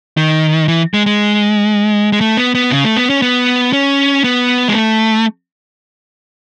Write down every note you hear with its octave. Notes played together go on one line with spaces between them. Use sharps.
D#3
E3
G#3
G#3
G#3
A3
B3
B3
C#3
A3
B3
C#4
B3
C#4
B3
G#3
A3